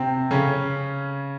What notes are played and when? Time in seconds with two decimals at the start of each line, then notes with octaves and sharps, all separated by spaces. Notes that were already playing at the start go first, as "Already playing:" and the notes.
Already playing: C3 C4
0.31 C#3 C#4